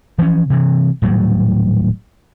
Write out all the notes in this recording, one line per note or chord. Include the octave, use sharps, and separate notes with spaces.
E3 F3 A#3 C#4
C3 E3
D#1 A2 F#3 G3